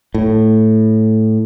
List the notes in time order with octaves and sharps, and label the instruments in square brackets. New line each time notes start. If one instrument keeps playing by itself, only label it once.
[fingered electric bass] A2